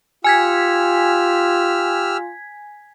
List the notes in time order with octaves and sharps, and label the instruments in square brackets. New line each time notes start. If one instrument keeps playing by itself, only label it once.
[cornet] F4 [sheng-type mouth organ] G4 E6 F6 [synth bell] G#5 G#6 B6